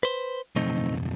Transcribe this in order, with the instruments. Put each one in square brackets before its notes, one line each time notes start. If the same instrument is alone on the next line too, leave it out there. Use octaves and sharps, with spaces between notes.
[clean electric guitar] B4 C5
[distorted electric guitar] B1 F2 [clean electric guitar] A3 C4 D#4